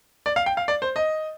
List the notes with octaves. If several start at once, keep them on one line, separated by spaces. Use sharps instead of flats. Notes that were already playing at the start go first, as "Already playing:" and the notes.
D5
F5
G5
F5
D5
C5
D#5